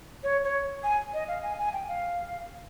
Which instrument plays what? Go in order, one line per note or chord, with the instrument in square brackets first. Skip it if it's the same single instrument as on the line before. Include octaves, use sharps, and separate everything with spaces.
[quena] C#5
C#5
G#5
D#5
F5
G#5
G#5
G5
F5